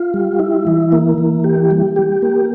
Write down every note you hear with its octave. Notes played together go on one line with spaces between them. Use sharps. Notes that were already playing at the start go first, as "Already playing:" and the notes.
Already playing: F4
G3
E4
E3
A#3
E3
G4
G3
G4
A#3